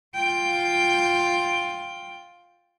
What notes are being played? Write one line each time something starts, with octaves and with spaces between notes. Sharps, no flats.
F4 G5